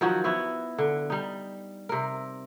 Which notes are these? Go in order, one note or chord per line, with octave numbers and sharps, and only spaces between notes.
D#3 F3 F#3 F#4
B3 E4 F#4
D3
G3 D#4
C3 A#4